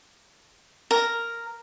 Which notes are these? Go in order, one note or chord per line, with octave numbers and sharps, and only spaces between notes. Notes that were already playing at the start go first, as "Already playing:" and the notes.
A#4